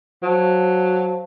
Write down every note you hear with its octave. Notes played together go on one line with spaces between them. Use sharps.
F#3 C5 F5 A5